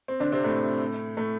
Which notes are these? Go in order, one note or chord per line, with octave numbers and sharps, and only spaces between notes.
C4
D3 D4
C3 C4
A2 A3
A2 A3